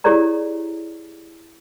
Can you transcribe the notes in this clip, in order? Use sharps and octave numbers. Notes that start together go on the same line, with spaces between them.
E4 G4 G#4 C#5 D5 A#5